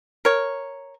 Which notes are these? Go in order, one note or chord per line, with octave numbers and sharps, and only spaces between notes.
A#4 C#5